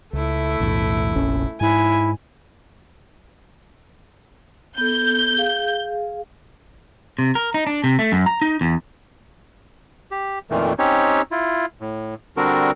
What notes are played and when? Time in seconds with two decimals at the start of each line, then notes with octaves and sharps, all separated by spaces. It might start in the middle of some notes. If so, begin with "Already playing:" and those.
0.13 C#2 A3 E4
0.60 B1 E2 A2
1.15 F1 A#1 C#4
1.61 G#2 E4 G#5
4.78 B3 A4 G6
5.37 G#4 F5
7.19 C3
7.35 A#4
7.54 D#4
7.67 D4
7.84 C3
7.99 A3
8.12 F#2
8.26 A#5
8.42 D#4
8.61 E2
10.11 G4
10.50 F2 A#2 D#3 E3 A3
10.79 C4 C#4 D#4 G4 C#5
11.32 E4 F4
11.80 A2
12.37 D3 G3 C4 D4 F#4 A#4